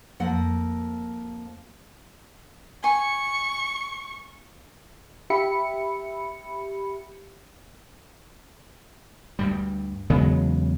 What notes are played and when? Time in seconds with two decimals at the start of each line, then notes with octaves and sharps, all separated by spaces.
0.20 F2 A#3 F#5
2.84 G#5 C#6
5.30 G4 E5 B5 C#7
9.39 D2 G2 G3
10.10 E2 C#3 F#3 G#3 B3